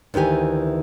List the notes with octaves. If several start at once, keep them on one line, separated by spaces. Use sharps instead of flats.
D2 D#3 E3 G4 G#5